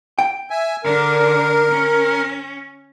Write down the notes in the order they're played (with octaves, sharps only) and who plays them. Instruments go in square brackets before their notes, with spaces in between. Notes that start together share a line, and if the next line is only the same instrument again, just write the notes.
[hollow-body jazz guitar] G5
[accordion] E5 G#5
[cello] D3 D4 [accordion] A#4
[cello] C#4